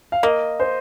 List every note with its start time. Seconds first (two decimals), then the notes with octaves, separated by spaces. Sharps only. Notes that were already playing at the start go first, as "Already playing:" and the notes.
0.12 F5
0.23 A#3 D#5
0.60 C5